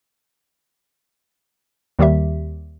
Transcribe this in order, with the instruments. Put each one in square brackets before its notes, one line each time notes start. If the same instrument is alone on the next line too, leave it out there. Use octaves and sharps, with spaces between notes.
[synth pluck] D#2 D#3 G3 G4 E5